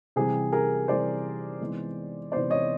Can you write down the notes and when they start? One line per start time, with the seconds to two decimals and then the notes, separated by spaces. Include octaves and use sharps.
0.16 C3 E3 G3 G#4
0.52 G#4 A#4
0.88 C3 E3 G3 C5 D5
1.60 C3 E3 G#3 B3 D#4
2.32 C3 E3 G#3 B3 D#4 C5 D5
2.50 C#5 D#5